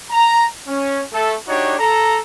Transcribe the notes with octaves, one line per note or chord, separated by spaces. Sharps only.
A#5
C#4
A3 A4
D4 D#4 F#4 G4 C#5
A4 A#5